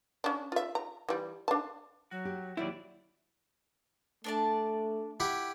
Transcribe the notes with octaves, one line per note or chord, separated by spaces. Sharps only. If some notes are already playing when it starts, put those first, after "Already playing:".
C#4 D4
F4 E5
A#5
E3 G3
D4 A5
F#3 F#4
G4
D#2 F#3 G3 E4 D5
A3 D4 D5 A5
E4 G4 F#5